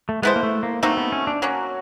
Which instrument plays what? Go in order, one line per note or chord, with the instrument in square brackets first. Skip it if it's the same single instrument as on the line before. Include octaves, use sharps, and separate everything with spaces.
[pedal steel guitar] A3
[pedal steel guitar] G#3 [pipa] B3 E4 A4 C5
[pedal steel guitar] A#3
A3
A#3
[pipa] A3 C4 D#4 F#4 [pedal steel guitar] A#3
[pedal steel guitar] B3
C#4
D4
[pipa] F#3 A#3 C#4 [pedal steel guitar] F#4